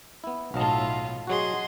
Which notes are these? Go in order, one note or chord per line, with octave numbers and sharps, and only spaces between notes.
B3 E4
B1 A2 F#3 F4 D#5 F5 A5
F#3 F#4 G#4 D#5 C6